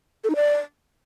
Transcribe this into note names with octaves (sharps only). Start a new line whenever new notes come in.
A4
D#4
D5